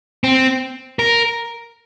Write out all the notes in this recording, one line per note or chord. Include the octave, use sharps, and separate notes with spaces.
C4
A#4